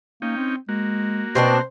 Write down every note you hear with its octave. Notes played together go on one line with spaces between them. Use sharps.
A#3 C#4 D#4 G5
C4
G#3 A#3 F#4
B2 C4 D4 B4 C5